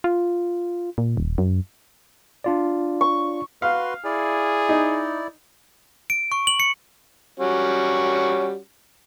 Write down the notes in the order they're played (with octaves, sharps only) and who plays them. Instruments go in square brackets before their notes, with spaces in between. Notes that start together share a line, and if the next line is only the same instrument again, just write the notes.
[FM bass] F4
A#2
D#1
F#2
[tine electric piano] D4 F4 D5
[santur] C#6
[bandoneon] F#4 B4 C6 [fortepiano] F5
[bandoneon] E4 D5 [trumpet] G#4
[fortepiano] D#4
[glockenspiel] D7
C#6
F#7
C#7
[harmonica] G3 C#4 F#4